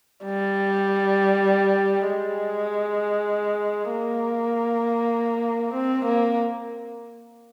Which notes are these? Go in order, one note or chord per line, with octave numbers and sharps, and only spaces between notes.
G3
G#3
A#3
C4
A#3